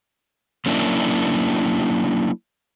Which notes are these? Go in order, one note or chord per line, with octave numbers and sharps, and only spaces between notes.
F#3 A#3 C#4 D4 E4